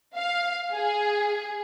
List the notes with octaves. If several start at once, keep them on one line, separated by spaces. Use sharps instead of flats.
F5
G#4